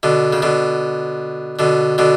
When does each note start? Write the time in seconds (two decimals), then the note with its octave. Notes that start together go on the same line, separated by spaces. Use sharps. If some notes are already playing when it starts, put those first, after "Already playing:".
0.03 B2 D3
0.33 C#3
0.42 B2 D3
1.59 B2 D3
1.98 B2 D3